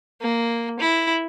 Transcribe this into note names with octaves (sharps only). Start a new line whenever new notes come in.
A#3
E4